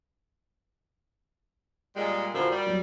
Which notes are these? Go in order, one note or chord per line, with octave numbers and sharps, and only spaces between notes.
A#2 G3 G#3
E2 D3 F3 F#4 A#4
G3
F#3